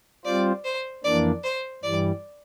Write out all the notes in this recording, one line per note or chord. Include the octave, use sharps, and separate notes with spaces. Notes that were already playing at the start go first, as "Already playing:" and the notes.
G3 C4 F4 C5 D5
C5
F2 E3 A#3 D4 D5
C5
G2 E3 G3 D5